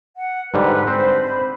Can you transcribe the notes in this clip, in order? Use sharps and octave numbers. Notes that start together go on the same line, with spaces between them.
F#5
G#2 D3 G3 B4
C4 D4 C5 B5